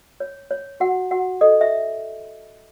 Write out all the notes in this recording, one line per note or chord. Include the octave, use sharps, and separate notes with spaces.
C#5
C#5
F#4 F#5
F#4 F#5
A4 D#5
E5